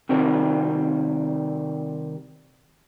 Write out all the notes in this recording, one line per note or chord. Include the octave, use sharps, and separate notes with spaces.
C3 D#3 G3 C4